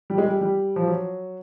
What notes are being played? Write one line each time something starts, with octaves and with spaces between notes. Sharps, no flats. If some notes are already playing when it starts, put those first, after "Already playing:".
G3
G#3
G3
G3
F3
F#3